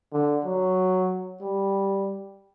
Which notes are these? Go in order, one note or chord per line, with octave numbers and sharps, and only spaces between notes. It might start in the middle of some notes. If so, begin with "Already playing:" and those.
D3
F#3
G3